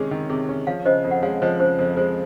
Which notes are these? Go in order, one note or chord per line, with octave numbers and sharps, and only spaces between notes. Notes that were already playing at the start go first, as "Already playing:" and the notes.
Already playing: C3 D#3 G#3 C#4 G#4
D#3
C3 G#4
C#4
F3 C#5 F5
C#3 C5 D#5
F2
F#5
G#3 C#5 F5
F3 C5 D#5
C#3 C5
F2 C5
G#3 C5